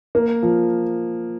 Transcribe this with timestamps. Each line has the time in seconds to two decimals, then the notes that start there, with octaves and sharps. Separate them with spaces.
0.15 A#3
0.43 F3